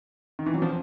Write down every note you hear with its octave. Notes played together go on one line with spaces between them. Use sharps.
D#3
E3
F#3
F3